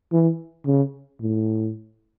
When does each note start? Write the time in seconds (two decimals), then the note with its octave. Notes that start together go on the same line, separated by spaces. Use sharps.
0.12 E3
0.66 C#3
1.21 A2